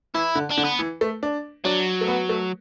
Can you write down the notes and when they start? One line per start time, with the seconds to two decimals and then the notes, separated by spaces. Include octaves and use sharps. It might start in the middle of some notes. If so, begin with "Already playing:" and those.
0.14 E3 E4
0.35 D3
0.50 D4
0.57 D3
0.64 B3
0.79 E3
1.01 A3
1.23 D4
1.65 F#3 D4
2.01 A3
2.08 B3
2.29 A3